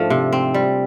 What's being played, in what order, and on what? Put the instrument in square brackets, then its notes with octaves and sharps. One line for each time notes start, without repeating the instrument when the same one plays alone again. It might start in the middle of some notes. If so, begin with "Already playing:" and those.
Already playing: [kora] G#2 F3 A3 D4
C3
C4
G3